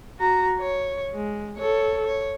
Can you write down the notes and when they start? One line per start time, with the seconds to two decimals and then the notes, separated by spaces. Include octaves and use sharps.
0.19 F#4 A#5
0.60 C#5
1.14 G#3
1.57 A4 C#5
2.06 C#5